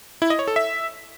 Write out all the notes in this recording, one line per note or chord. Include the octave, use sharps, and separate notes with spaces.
E4
D#5
C#5
A4
E5